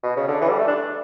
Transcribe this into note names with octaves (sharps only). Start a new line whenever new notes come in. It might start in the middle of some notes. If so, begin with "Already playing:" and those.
B2
C#3
D3
E3
G3
A3
D4